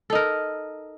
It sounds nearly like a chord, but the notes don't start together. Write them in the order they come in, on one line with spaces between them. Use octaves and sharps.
A4 D#4 A#4